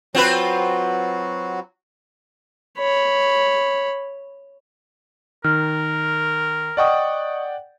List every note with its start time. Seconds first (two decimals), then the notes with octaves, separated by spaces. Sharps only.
0.15 F#3 C4 F4 F#4 B4
2.78 C#5 B5
5.44 D#3 A#4 F6
6.77 D5 D#5 F#5 G5 C#6 D#6